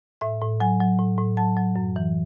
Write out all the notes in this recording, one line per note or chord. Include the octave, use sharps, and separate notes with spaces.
A2 E5
A2
F#3 G#5
F#3
A2
A2
F#3 A5
F#3
F#2
E3